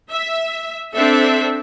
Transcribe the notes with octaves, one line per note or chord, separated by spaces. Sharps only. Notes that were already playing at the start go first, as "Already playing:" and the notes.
E5
C4 D4 A4 E5